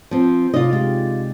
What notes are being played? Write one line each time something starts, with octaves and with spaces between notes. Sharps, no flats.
F3 C4
C3 D#4 F4 D5 D#5
G#3 F4 G4